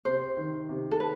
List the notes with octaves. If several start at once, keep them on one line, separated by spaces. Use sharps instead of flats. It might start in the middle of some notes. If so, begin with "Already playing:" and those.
C3 C5
D#3
C3
A4
B4